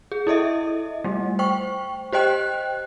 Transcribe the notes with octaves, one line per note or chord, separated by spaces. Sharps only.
G#4
E4 A4 D#5 E5
G3 A3
C5 G5 C#6
G4 C5 D#5 G5 F#6